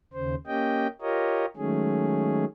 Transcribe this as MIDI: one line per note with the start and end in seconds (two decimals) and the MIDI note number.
0.13 0.35 39
0.13 0.35 49
0.13 0.35 72
0.47 0.87 58
0.47 0.87 61
0.47 0.87 67
0.47 0.87 75
0.47 0.87 79
1.02 1.46 65
1.02 1.46 67
1.02 1.46 70
1.02 1.46 73
1.02 1.46 75
1.57 2.45 51
1.57 2.45 54
1.57 2.45 56
1.57 2.45 57
1.57 2.45 61
1.57 2.45 68